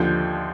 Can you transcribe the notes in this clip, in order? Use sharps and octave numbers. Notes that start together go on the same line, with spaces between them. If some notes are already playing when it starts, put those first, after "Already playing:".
Already playing: D#2 D3 F3 G6